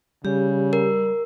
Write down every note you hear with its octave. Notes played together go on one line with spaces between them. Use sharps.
C#3 G3 G4
A#4